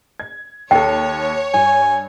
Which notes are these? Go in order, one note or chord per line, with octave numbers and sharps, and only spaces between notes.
G#6
D#2 A4 C#5 G5
G2 G#5